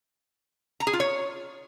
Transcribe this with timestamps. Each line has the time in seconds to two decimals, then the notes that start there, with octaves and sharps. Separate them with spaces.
0.80 A#5
0.87 G#4
0.93 F4
1.00 C#5